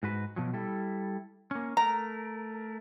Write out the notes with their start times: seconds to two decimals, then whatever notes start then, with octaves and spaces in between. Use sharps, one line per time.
0.03 G#2 F#4 B4
0.36 B2 F3 F#3
0.53 G3 E4 A4
1.51 A#3 C#4
1.77 A3 A#4 A#5